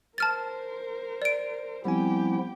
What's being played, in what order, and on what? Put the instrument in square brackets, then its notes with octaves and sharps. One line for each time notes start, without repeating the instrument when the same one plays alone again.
[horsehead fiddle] A#4 C5 [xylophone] A5 F6 A6
[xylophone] D5 D7
[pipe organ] F3 B3 E4 [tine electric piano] G3 C4 G#5 [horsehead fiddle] G4 G5